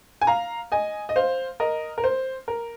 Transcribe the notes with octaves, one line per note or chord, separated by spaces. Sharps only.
G#5
F5 A#5
D#5 G#5
D#5
C5 F5
A#4 D#5
A#4
C5
A#4